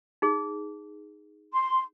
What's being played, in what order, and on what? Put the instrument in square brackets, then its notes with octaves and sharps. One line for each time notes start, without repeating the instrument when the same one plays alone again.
[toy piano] D#4 G#4
[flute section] C6